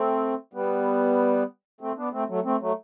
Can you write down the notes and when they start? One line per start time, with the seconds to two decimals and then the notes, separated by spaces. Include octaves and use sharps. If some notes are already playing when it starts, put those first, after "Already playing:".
Already playing: A3 C4
0.54 G3 B3
1.81 A3 C4
1.97 B3 D4
2.13 A3 C4
2.29 F#3 A3
2.45 A3 C4
2.61 F#3 A3